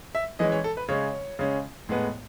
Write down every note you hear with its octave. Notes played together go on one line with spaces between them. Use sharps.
E5
E3 G#3 C#4 D#5
C#5
A4
B4
C#3 G#3 C#4 C#5
C#3 G#3 C#4
A2 G#3 B3